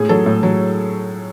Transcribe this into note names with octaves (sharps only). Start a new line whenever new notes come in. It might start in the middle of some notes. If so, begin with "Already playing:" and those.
Already playing: A2 G#4
F#3 A4
A2
F#3